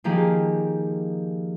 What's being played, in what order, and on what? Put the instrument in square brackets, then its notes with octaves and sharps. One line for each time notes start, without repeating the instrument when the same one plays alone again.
[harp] D#3 F3 A#3 G4 G#4 A#4